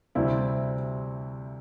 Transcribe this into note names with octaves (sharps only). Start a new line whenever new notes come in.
D2 C3 G3 C4 E4